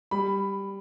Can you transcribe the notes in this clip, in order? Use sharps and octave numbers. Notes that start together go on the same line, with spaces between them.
G3 B5